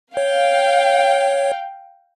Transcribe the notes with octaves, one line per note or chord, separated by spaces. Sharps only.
C#5 F5 G5